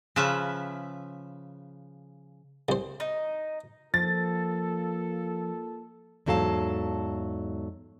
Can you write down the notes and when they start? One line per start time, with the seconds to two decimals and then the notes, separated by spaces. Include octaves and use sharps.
0.16 C#3 F3 B4 E5
2.69 C2 C5
3.00 D#4
3.94 F3 A#3 F4 A4 A6
6.26 E2 G#2 F#3 A4 F5 A5